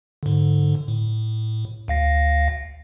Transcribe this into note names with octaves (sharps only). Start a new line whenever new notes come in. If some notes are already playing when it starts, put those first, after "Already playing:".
G#2 D3
A2
D2 F5 A#6